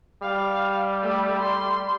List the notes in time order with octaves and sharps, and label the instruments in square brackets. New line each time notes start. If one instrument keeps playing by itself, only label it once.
[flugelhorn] G3 [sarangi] F5
[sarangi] A3
C6